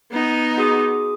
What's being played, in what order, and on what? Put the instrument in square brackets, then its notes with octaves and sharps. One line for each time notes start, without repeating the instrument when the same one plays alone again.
[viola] B3 D#4
[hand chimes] F#4 G#4 D#6